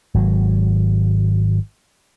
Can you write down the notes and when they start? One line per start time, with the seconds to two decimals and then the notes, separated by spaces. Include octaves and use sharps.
0.14 G#1 F#3